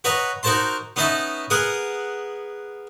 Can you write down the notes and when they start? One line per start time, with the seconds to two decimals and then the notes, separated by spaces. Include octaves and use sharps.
0.04 F#4 B4 C#5 D#5 A#5
0.43 D#4 F#4 A#4 C5 A5 C6
0.96 B3 C#4 D#4 D#5 E5 A5
1.50 B3 G#4 A#4 F#5 D#6